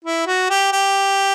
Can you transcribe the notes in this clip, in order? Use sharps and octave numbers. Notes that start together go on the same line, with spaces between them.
E4
F#4
G4
G4